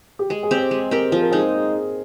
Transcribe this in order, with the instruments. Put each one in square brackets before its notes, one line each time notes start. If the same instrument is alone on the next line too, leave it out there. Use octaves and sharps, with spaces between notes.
[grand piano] G4
[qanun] G#3 [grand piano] G#4
[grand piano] G#4
[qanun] C4 G4
[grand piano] C5
[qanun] G#3
[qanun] C4 G4 [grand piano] A#4
[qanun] F3 [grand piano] G#4
[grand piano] A#4
[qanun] G#3 D#4 [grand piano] G#4